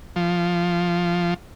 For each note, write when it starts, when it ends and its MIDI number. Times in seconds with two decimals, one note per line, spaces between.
0.16 1.34 53